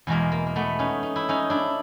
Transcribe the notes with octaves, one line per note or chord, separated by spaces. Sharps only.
E2 B2 G#3 A#3
A#3
A#3
A3 B3
C#4 D#4
D#4
E4
C#4 D#4
D4 E4